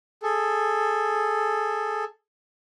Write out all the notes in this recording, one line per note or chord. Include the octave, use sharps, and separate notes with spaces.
G#4 A4